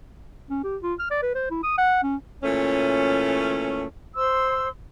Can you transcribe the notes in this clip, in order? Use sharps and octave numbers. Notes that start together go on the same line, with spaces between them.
C#4
G4
F4
F6
D5
B4
C5
E4
D#6
F#5
C#4
A#2 E3 A3 C#4
C5 C6 E6